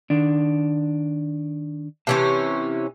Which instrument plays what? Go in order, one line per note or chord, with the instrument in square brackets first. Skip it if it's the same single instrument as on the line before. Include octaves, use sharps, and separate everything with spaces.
[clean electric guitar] D#3 D4
[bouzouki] C3 E3 C#4 [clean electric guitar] C#5 E5 A5